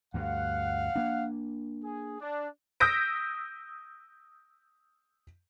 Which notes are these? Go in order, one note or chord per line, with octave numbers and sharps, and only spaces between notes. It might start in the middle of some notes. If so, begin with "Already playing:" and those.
D2 G2 F5 F#5
A#3 D4
G#4
D4
D#6 E6 G6 A#6 B6 D7